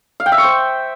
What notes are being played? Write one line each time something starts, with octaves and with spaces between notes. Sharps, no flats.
F5
G5
E5
C#6
C5